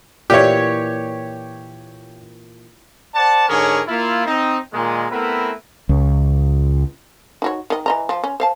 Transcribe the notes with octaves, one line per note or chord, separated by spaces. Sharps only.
A#2 E3 G4 C#5
C5 D5 F#5 A5
G#2 D3 C#4 G#4 A#4 C#5
A#3 E4 F4
C4 D#4
A#2 D#3 G#3
A3 B3 C4 E4 A#4 B4
C#2
D#4 F#4 C#5
D#3 D#5
E3 D#5 A#5
F3
C#4
C5 F5 A5